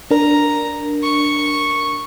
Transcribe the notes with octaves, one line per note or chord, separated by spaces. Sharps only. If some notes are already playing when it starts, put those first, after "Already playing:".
D4 A#4 A#5
C#6